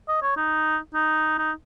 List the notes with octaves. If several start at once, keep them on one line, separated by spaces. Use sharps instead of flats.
D#5
C#5
D#4
D#4
D#4